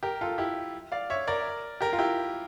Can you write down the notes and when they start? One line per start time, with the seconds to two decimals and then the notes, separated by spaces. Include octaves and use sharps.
0.03 G4 A#4
0.21 F4 A4
0.38 E4 G4
0.92 D5 F5
1.10 C#5 E5
1.28 A#4 D5
1.81 G4 A#4
1.93 F4
1.98 E4 G4